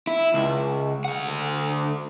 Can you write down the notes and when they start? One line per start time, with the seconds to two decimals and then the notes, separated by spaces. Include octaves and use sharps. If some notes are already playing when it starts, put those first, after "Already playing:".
0.07 E4
0.34 C#2
1.05 D2 F#5